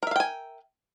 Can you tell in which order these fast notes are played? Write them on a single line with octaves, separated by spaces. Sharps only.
A#4 E5 F5 G5 G#5